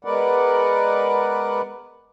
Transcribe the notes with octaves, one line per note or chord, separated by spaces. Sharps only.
G#3 B3 A#4 B4 D5 F#5